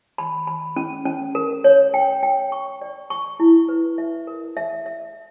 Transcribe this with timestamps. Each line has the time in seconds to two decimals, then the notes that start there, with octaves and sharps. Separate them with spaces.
0.18 B5
0.47 B5
0.76 C#4
1.05 C#4
1.35 A#4
1.64 C#5
1.94 G5
2.23 G5
2.52 C#6
2.82 D5
3.10 C#6
3.40 E4
3.69 B4
3.98 E5
4.27 A#4
4.57 E5
4.86 E5